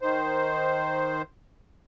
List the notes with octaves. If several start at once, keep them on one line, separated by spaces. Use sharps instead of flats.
D#3 C5